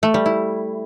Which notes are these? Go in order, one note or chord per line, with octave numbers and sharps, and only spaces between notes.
A3
G3
E4